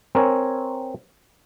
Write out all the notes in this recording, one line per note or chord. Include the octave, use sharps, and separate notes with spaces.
C4 A#4 C#5 G#5